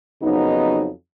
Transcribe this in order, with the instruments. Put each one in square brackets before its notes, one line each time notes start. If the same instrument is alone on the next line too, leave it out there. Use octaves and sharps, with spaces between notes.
[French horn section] F2 C#3 F#3 B3 D#4